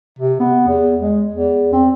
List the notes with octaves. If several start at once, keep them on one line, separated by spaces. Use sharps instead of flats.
C3
B3
E2
G#3
E2
C4